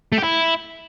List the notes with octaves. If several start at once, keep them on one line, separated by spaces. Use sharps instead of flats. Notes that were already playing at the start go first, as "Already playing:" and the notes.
A3
G4
E4